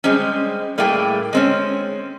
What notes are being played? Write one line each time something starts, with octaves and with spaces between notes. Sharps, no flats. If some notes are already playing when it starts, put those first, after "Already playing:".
G3 G#3 C4 C#4
A2 G3 A3 A#3 G#4 G5
G#3 C4 C#4